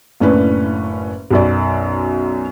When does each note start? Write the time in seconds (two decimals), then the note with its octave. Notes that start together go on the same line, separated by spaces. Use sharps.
0.20 F#1 A2 C#4 D4 B4
1.31 B1 F#2 D5